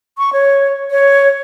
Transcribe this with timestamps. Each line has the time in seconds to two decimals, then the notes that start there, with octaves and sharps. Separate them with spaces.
0.18 C#6
0.33 C#5
0.91 C#5